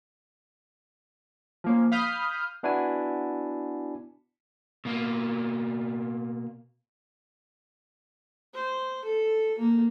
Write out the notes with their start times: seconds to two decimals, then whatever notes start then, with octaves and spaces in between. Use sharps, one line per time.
1.64 F3 A#3 C#4
1.92 F5 B5 D#6 F6 G6
2.63 B3 D4 E4 F#4 G#5
4.85 B2 A#3
8.54 C5
9.05 A4
9.59 A#3